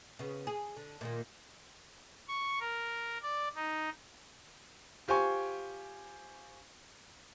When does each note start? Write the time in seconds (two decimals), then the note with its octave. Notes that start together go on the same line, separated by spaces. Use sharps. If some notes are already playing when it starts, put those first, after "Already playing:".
0.19 C#3 B3
0.47 G#4
0.76 D3
1.01 A#2 D#3 A#3
2.28 C#6
2.60 A#4
3.22 D5
3.55 D#4
5.08 F4 G4 C5 G#5 C#6